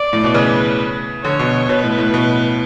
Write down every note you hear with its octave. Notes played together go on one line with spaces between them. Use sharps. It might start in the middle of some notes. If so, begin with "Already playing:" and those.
Already playing: D5
A2
B2
C#3 B4
D3 C#5
B2
B2 B4
A2
A2
B2